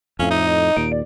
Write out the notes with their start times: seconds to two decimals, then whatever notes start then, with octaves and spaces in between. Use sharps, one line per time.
0.19 F2 A2 C#4 F5
0.31 D#4 E5
0.46 D#5
0.77 D#2 A#2 D7
0.92 D5